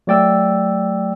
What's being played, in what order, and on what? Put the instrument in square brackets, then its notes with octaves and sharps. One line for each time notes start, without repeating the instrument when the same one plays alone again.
[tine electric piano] F#3 A3 D5 G5 E6